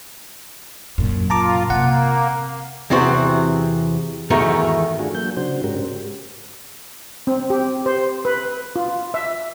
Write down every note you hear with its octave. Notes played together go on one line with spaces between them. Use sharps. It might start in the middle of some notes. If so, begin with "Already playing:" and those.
F#2 A#2
F4 A5 A#5 D6
C3 A#3 F#5
E2 C3 E3 C4 F#4 C5
E2 G#2 D#3 A3 F#4 A#4
A3 D4 F4 F#4 G#4
F#3 A#3 G6
C#3 D4 F#4 C5
G#2 G#3 C#4 F#4 G4 A#4
C4
G4
C5
B4
F4
E5